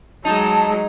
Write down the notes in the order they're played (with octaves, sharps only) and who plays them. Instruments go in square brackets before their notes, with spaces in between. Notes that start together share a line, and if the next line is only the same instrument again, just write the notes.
[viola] F#3 G#3 [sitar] D#4 [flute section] A5